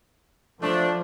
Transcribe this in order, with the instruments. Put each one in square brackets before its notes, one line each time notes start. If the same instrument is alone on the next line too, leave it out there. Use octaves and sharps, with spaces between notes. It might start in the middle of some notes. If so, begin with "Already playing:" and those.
[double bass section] F3 [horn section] A3 D4